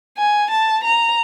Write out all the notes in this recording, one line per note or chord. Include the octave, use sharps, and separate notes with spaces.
G#5
A5
A#5